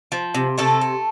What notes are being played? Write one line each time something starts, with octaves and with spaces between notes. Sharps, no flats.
F3
C3
C3 A3 A4
A3